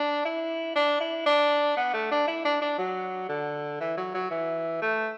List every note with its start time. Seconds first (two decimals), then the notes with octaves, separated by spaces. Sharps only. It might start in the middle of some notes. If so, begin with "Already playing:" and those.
Already playing: D4
0.25 E4
0.75 D4
1.00 E4
1.26 D4
1.77 B3
1.93 A3
2.11 D4
2.27 E4
2.45 D4
2.62 D4
2.78 F#3
3.29 D3
3.80 E3
3.97 F#3
4.14 F#3
4.30 E3
4.82 A3